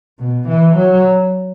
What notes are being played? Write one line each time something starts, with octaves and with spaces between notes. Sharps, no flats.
B2
E3
F#3